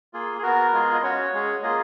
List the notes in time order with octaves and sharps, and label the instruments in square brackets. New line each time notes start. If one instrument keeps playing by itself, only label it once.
[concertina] A#3 F4 G#4
G#4
B3 F#4 A#4
G#3 B3 F4 G#4
D#5
C#4 F#4 C#5
G#3 C#4 G#4
A#3 F4 G#4 D#5